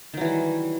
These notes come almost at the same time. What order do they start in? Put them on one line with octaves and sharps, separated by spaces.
D#3 F#3 E3 G3